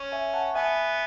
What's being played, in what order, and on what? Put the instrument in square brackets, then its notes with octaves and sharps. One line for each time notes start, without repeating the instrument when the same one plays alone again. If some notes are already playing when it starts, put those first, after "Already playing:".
Already playing: [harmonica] C#4
[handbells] E5 G#5
F#5 A5
[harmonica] B3 [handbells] E5 G#5